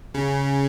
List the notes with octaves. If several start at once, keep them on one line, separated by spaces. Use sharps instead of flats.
C#3